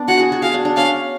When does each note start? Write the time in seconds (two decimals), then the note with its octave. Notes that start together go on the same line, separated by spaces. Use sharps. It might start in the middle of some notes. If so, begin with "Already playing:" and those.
Already playing: B3 D4
0.08 F#4 F#5
0.20 G#4
0.32 F#4
0.42 G#4 F5
0.54 D4
0.65 D4
0.76 C#4 F5